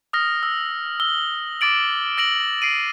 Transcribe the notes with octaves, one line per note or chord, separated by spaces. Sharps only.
D#6 F6 A#6
E6
E6 G7
D6 A6 D7 F#7
E6 A#6 D7 F#7
C7 D7 D#7